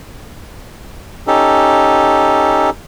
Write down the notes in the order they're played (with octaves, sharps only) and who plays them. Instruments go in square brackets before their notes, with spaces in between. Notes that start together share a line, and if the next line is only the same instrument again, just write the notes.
[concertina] C#4 D#4 G4 A4